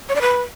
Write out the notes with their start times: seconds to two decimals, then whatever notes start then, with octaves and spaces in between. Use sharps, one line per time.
0.09 C#5
0.15 D5
0.21 B4